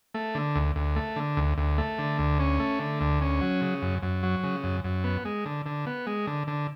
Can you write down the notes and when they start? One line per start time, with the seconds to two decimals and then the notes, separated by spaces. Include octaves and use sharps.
0.14 A3
0.35 D3
0.55 D2
0.76 D2
0.96 A3
1.16 D3
1.37 D2
1.58 D2
1.78 A3
1.98 D3
2.19 D2
2.39 C#4
2.60 A3
2.80 D3
3.01 D2
3.21 C#4
3.41 F#3
3.62 C#3
3.82 F#2
4.02 F#2
4.23 F#3
4.43 C#3
4.64 F#2
4.84 F#2
5.04 B3
5.25 G#3
5.46 D3
5.66 D3
5.86 B3
6.07 G#3
6.27 D3
6.47 D3